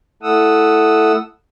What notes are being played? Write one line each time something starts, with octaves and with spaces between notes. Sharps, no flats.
A3 E4 A4 F#5 D#6 E6